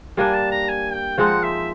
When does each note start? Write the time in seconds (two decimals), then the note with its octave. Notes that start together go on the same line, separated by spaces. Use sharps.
0.17 G3 A#3 D4 G#5
0.34 A5
0.51 A#5
0.69 G#5
0.93 G5
1.18 F3 G#3 C4 D#4 F#5
1.43 E5